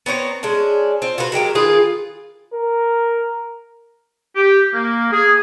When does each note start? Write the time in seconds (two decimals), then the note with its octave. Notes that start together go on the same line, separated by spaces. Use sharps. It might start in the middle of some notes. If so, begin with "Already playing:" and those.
0.06 B3 C4 C#5 A#5
0.43 G#3 C#4 D4
1.02 C4 F4
1.18 F4 F#4 A#4 B4
1.32 F#3 G#3 G4 A#4
1.55 D#3 F4 G#4 B4
2.53 A#4
4.36 G4
4.73 A#3
5.12 G#4